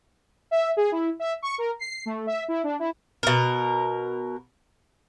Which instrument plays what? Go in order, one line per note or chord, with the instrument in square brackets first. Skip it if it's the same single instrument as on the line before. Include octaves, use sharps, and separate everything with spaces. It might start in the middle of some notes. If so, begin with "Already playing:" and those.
[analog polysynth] E5
G#4
E4
E5
C#6
A#4
C7
A3
E5
E4
D4
E4
[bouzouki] B2 A#4